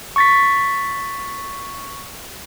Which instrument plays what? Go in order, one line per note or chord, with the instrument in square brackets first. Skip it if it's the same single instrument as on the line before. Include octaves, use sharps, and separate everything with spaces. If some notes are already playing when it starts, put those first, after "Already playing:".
[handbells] C#6 A6 B6